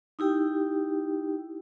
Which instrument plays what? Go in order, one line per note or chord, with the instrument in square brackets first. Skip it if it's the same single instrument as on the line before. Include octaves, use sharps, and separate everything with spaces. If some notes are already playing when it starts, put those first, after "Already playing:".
[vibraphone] D#4 E4 G4 G5